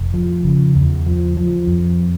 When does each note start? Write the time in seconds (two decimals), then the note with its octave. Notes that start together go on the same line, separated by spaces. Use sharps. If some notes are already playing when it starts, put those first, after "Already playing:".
Already playing: F1
0.14 F3
0.44 C#3
0.76 E2
1.06 F3
1.37 F3
1.67 F2